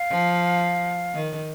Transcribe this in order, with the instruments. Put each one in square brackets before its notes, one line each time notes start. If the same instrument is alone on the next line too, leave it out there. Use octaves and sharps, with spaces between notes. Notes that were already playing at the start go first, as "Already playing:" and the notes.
Already playing: [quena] F5
[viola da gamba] F3
D#3